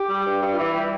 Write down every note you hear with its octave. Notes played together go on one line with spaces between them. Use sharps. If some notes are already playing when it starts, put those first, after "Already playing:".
Already playing: G4
G3
G2
G2
F4
E3 E4
G3